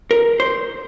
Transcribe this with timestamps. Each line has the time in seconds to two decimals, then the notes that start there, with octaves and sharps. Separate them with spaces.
0.11 A#4
0.40 C5